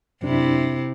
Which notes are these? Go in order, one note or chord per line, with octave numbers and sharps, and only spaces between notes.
F#2 C3 D4 E4